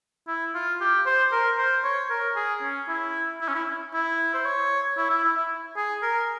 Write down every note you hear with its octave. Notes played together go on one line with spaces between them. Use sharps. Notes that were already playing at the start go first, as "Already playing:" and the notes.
E4
F4
G4
C5
A#4
C5
C#5
A#4
G#4
C#4
E4
E4
C#4
E4
E4
C5
C#5
E4
E4
E4
E4
G#4
A#4